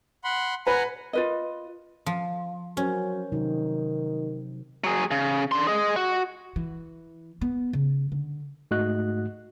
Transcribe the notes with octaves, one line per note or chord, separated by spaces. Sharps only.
F#5 B5 C6
B4 F#5 G#5 A#5
F4 B4 D#5
F3
F#3 C#4 A#4 C5
C3 D#3 F#3 D#4
F#3 G#4
C#3
D4 C6
G#4 D#5
F#4
E3
B3
C#3
D3
G#2 A3 F#4 D#5 F#6